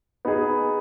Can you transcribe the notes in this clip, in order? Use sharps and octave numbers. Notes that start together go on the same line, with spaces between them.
B3 D#4 G#4